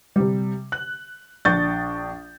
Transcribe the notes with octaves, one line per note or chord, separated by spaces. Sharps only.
C3 G3
F#6
A#1 D4 C#6 G6 A6